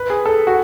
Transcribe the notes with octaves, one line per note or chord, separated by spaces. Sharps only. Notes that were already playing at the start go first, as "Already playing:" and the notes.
Already playing: B4
G#4
A4
F#4